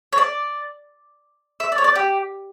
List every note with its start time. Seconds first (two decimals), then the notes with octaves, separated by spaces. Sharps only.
0.13 C#5
0.18 D5
1.60 E5
1.72 D5
1.78 C#5
1.84 D5
1.95 G4